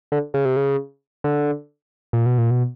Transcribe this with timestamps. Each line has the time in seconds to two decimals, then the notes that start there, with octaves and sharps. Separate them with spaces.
0.12 D3
0.34 C#3
0.45 C3
0.56 C#3
1.24 D3
2.13 A#2
2.26 B2
2.38 A#2
2.50 B2